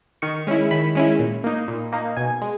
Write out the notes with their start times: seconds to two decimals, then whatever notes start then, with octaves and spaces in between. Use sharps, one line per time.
0.22 D#3 C#6
0.47 G#3 C#4 E4
0.71 D#3 B5
0.95 G#3 C#4 E4
1.19 A#2
1.44 A#3 D#4
1.68 A#2
1.92 A#3 D#4
2.17 B2 G#5
2.42 G#3